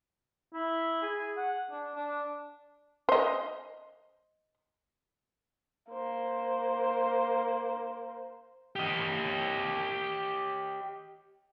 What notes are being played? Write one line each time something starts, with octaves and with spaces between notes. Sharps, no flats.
E4
G#4
F#5
D4
D4
C5 D#5
A#3 C5
G4 D#5